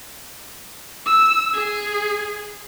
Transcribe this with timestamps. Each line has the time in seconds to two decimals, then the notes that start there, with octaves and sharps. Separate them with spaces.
1.06 E6
1.54 G#4